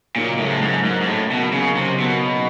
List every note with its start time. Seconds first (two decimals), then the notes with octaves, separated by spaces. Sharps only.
0.16 A#2 C#3 F#3 A#3 D#4
0.39 A2
0.46 G#2
0.52 A2
0.62 G#2
0.85 G#2
1.01 G#2
1.07 A2
1.31 B2
1.53 C#3
1.76 C3
2.00 B2